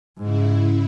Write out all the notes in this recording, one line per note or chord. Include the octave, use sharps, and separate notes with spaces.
G#2 C#3 E4